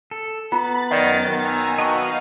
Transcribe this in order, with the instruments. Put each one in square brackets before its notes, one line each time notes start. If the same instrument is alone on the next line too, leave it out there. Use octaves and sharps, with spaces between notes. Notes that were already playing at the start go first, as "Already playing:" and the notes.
[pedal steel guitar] A4
[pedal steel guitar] B3 [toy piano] F4 A#5 [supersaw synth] B5 A6
[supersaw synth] F#2 A6 [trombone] D#3 [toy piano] D5 D#5 F#5
[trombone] D#3 [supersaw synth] G#5 A#5 E6
[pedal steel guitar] B3 F#4 D#5 [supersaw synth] D#4 F5 [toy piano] A5 C#6